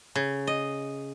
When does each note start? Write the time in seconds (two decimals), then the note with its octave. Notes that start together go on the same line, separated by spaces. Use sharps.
0.15 C#3
0.47 D#5